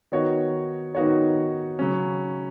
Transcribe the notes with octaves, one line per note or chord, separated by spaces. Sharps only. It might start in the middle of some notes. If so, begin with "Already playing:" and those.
D#3 B3 D#4 F#4 C#5
D#3 B3 D#4 F#4 C#5
C#3 F#3 C#4